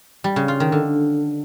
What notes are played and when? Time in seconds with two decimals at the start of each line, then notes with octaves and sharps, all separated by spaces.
0.24 G3
0.36 C#3
0.48 F4
0.60 D#3
0.72 D3